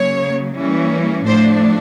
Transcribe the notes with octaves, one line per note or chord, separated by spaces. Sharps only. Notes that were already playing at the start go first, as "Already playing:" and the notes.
Already playing: C#3 F#3 A#3 C#5
E3 G3 A#3 C#4
A2 F3 A3 D4 C5